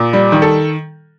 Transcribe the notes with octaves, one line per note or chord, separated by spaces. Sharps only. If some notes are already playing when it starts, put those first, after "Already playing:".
Already playing: A#2
G3
D#3
A4